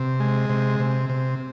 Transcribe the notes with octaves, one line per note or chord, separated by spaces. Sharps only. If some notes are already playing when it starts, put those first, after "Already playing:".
Already playing: C3
G#3
C3
C3
C3